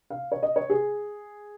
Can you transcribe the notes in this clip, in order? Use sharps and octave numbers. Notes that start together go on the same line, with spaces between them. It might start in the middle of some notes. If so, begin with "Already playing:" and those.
F5
C#5
D#5
C#5
G#4